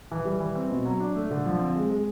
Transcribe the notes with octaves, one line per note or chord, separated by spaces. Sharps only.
E3
G3
E3
C4
B2
F#3
D4
A3
D3
F3
C4
G#3
G#3